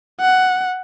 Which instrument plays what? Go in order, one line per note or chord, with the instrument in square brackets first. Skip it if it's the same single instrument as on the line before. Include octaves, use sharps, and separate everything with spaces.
[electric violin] F#5